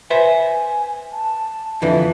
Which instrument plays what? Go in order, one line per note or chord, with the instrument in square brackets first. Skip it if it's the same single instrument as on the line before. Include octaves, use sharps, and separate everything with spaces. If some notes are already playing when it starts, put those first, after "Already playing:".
[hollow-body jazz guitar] B4 C5 E5 [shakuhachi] G#5
[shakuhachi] A5
[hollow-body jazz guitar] F2 D3 E3 [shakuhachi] E5